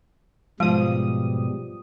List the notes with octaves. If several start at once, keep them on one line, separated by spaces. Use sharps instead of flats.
G#2 B2 F3 G3 G#3 D#6